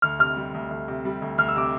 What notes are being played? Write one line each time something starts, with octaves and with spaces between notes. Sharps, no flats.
D2 F6
C3 F6
G3
D2
D2
C3
G3
D2
D2 F6
E6
C3 D6